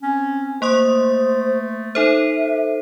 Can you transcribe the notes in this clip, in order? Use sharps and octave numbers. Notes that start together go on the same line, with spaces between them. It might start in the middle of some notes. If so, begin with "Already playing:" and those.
C4 C#4
A3 A#3 C5 C6 D#6
D#4 A4 C5 E5